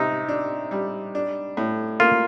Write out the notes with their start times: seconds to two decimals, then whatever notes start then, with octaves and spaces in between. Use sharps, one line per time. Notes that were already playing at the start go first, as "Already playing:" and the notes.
Already playing: C3 D#4
0.29 D4
0.71 G3
1.15 D4
1.57 A2
2.00 A#3 F4